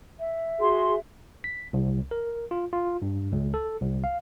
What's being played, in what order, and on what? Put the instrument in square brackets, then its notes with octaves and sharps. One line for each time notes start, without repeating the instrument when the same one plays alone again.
[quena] E5
[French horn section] F#4 G#4 [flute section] C6
[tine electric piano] B6
C2
A#4
F4
F4
G2
C#2
A4
C2
F5